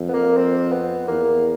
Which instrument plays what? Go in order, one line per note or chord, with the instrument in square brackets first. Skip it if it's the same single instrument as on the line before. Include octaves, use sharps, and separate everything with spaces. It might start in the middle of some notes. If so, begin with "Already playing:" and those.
Already playing: [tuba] F2
[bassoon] B3
A#3
C4
B3
[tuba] E2 [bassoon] A#3